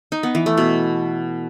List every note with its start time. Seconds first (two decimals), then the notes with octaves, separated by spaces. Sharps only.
0.12 D#4
0.23 B3
0.35 E3
0.46 A3
0.58 B2